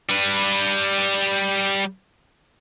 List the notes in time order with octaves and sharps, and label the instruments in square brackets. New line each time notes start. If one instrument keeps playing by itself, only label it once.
[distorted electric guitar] G3 B4